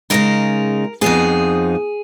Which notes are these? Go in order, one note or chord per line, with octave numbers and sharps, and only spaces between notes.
C#3 G#3 D#4 A#4
F2 F3 B3 D#4 G#4